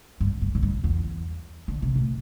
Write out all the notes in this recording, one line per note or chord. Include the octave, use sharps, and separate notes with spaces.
G2
G2
A2
G2
E2
D3
C3
A2